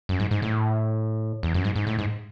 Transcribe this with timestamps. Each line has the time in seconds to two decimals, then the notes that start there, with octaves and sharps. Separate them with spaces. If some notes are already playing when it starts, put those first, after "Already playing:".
0.09 F#2
0.20 G#2
0.31 G#2
0.42 A2
1.43 E2
1.54 F#2
1.64 G#2
1.76 G#2
1.87 A2
1.99 G#2